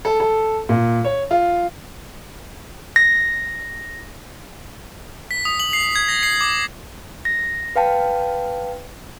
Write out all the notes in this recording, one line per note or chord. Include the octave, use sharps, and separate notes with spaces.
A4
A4
A#2
C#5
F4
A#6
B6
D#6
F#7
C7
G#6
A#6
C7
D6
A#6
B4 F5 G5 A5